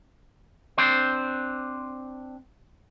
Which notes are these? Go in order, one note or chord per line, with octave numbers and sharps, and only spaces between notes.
C4 D4 C5